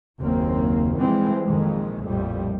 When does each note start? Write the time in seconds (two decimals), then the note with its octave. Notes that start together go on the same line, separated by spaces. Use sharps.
0.19 F#1 D#2 F#3 A#3 C4
0.98 E3 F3 G3 G#3 C4
1.46 A#1 F2 D#3 G#3
2.05 A#1 F2 A2 G3